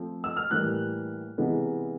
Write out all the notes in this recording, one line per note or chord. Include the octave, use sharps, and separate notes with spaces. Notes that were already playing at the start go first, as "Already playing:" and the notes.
Already playing: F3 A3 C4
E6
F6
A2 E3 G3 A#3 F#6
C3 E3 G#3 B3